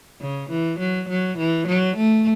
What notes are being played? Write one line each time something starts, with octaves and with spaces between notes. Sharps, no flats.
C#3
E3
F#3
F#3
E3
F#3
A3